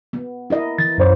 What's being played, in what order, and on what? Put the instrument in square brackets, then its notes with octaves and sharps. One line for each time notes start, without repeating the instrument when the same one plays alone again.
[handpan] B3
E4 A#4 D#5
[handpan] E3 [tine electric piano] A6
[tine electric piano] F#2 C5 C#5